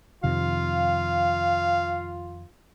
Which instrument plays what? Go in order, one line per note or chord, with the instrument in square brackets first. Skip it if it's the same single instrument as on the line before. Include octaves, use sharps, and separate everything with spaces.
[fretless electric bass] F2 C3 D#3 [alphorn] F4 [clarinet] F5